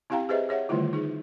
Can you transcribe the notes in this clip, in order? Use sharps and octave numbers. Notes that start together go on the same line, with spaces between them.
C4 E4 G4 F5 G5 A#5
G4 G#4 B4 C5 D#5 E5
G#4 C#5 E5 F#5
D3 D#3 G3 A3 E4 F4
D#4 G#4